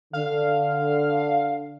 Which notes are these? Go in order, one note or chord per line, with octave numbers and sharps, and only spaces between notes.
D3 F5